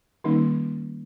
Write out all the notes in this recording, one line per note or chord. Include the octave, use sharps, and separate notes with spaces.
D#3 G3 A#3 C#4 D#4